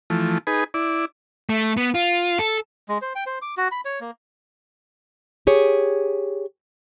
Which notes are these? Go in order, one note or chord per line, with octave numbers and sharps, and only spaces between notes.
E3 F3 A3
D#4 G#4 B4
E4 D5
A3
B3
F4
A4
G#3
C5
G5
C5
D6
F#4
B5
C#5
A#3
G4 G#4 C#5